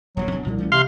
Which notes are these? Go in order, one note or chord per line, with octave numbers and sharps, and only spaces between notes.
D#1 A#1 A#2 F#3
D1 B2 D4
C2 A#2 F3
E3 A3 C#4
C3 F5 C6